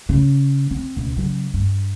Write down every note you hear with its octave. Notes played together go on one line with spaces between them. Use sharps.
C#3
C4
C#2 B2
C#3 F#3
G2